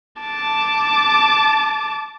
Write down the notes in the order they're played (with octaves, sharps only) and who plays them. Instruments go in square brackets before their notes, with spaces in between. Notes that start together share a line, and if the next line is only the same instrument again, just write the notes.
[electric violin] A5 D6